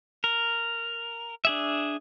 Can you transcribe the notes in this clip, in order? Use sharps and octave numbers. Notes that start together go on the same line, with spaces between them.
A#4
D4 G#4 E5